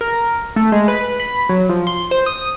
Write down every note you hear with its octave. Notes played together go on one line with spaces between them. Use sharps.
A#4
A3
G#3
B4
B5
F#3
F3
C6
C5
D#6